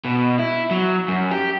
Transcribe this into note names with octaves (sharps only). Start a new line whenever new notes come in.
B2
E4
F#3
F#2
G4